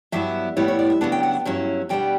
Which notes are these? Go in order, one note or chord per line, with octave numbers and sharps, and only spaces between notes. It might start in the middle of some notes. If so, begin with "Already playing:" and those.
G2 F#3 B3 E4 E5
A2 G3 B3 E4 C#5
C#5
D5
E5
C#3 F#3 B3 D4 F#5
G5
F#5
G2 F#3 C#4 E4
B2 G3 B3 D4 G5